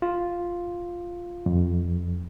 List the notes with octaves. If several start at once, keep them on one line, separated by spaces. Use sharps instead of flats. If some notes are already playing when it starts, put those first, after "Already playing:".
F4
F2